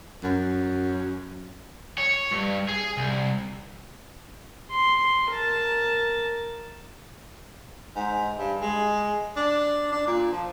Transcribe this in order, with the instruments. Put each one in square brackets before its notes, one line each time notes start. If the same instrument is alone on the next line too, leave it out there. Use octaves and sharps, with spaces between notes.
[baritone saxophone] F#2
[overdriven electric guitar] C#5
G2
G#4
C2
[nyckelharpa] C6
A#4 A5
[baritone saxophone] G#2
G2
G#3
D4
D4
A#2
F3